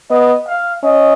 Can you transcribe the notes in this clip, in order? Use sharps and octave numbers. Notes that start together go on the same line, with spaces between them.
B3 D#5
F5
C#4 D#5